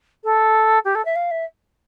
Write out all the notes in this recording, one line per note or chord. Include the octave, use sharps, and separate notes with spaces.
A4
G4
A4
E5
F5
E5